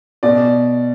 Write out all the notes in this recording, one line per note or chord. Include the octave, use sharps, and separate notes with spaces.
B2 D5